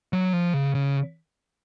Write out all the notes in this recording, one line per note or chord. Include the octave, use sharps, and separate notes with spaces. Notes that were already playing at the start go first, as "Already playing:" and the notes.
F#3
F3
C#3
C#3